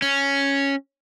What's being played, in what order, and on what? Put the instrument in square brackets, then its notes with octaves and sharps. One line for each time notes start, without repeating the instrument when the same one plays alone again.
[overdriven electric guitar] C#4